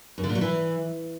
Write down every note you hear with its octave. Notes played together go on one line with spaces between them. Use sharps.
F#2
D3
A#2
F#3
E3